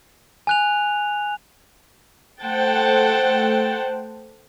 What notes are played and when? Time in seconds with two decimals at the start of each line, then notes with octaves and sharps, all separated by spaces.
0.47 G#5 F#6 F7
2.41 A3 C5 F#5 G5 A5